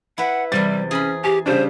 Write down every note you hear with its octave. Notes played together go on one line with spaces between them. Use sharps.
E4 B4 F#5
E2 C3 G3 A6
C#4 G#4 B5
G4 G#5
C#3 G3 D4 C5